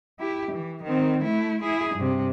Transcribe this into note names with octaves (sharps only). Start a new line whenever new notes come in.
E4 G4
E3
D#3 C4
A3 E4
E4 G#4
G2 C3